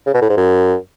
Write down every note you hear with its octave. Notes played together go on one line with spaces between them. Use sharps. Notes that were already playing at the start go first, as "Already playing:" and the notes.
C#3
B2
A2
G#2
F#2